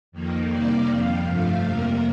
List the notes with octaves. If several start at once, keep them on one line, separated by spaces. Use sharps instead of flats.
F2 D#3 A#3
C3 D#3 G3 A#3 D5
F2 C3 G3 F5
G2 F3 A3 F5
F2 C3 G3 A#3 A#4